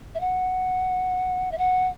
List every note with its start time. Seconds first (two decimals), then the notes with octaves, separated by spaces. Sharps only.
0.15 E5
0.20 F#5
1.52 E5
1.58 F#5